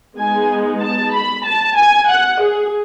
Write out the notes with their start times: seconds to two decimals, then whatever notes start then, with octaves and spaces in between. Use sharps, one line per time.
0.17 G#3 B3 D#4 G#5
0.80 A5
1.13 B5
1.44 A5
1.76 G#5
2.08 F#5
2.40 G#4